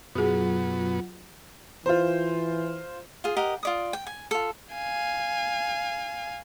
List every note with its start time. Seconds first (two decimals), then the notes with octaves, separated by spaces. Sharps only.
0.15 F#2 B2 F#3 B3 F4 F#4 G#4
1.86 E3 F4 C5
3.24 F4 G#4
3.37 G4 A#4 D#5 F#5
3.63 F4 D5 D#6
3.93 G5
4.07 G#5
4.31 F4 A4
4.74 F5 G#5